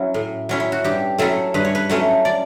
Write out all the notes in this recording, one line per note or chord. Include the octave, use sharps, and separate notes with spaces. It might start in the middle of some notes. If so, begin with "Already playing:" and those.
Already playing: F#3 C#4 E4
A2
F#3 C#4 E4
E4
F#4
G2 G4
F#3 A3 C#4 E4 A4
G2 B4
C#5
B4
F#3 A3 C#4 E4
D5